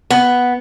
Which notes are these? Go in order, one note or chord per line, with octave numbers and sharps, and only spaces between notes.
B3